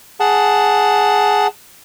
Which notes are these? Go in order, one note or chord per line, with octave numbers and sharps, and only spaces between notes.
G#4 F#5 A5